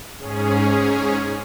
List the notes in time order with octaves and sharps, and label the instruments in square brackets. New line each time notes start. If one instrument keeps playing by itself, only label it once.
[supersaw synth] G#2 C#4 G#4